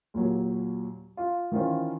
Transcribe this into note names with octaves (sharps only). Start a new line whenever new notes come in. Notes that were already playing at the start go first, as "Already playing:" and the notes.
D#2 A#2 F#3
F4
D#3 E3 C#4 D#4 F4 C5